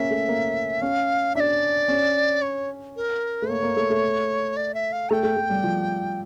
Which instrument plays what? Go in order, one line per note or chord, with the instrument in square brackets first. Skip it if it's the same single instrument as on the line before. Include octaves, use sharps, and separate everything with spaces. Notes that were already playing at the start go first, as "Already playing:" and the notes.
Already playing: [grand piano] A#3 C#4 [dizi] E5
[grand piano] A3
A#3
[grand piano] C#4 [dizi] F5
[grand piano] D4 [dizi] E5
[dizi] D5
[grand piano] C#4
[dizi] C#5
A#4
[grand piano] A3
[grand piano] A#3 [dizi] C#5
[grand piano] A#3
A3
A3
[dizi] D5
E5
F5
[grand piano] A3 [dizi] G5 A#5
[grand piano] A3
A3
G3
F3